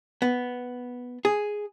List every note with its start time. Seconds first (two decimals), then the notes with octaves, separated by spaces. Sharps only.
0.22 B3
1.25 G#4